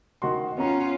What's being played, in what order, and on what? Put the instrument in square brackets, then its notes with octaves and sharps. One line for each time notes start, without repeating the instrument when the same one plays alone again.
[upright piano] D#3 F#4 C6
[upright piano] B3 A#5 [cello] C#4 F4